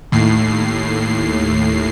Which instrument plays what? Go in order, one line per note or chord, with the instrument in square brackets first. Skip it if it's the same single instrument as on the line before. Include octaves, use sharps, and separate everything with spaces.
[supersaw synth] D#2 A2 C7